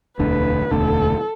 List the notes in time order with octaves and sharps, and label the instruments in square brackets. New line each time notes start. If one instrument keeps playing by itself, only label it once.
[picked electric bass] E1 D2 D3 [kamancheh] B4
[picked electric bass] E1 D2 D3 [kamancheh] A4